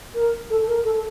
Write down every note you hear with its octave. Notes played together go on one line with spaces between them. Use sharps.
A#4
A4
A#4
A4